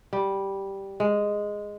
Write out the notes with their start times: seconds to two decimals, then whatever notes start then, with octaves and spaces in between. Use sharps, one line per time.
0.13 G3
1.00 G#3